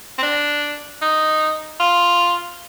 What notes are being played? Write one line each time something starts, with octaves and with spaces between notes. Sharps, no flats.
C4
D4
D#4
F4